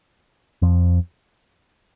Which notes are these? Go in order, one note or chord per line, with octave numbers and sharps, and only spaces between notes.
F2 F3